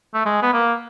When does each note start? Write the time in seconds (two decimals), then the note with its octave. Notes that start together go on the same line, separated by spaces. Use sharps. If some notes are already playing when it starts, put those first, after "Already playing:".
0.14 A3
0.26 G#3
0.42 B3
0.54 A#3